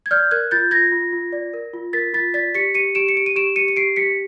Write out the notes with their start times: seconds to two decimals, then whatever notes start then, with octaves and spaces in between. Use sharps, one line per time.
0.06 G#6
0.11 D5 F6 G6
0.31 A#4 F#6 G#6
0.51 F4 G6 A6
0.71 F4 G#6 A#6
0.92 F4
1.13 F4
1.33 D5
1.54 A#4
1.74 F4
1.93 A#4 A6 B6
2.14 F4 A6 B6
2.34 D5 A6 B6
2.55 G4 B6 C#7
2.74 G4 C#7 D#7
2.95 G4 D7 E7
3.08 C#7
3.16 G4 D7
3.26 D#7
3.36 G4 D7 E7
3.56 G4 C#7 D#7
3.68 D#7
3.76 G4 C7 D7
3.96 G4 B6 C#7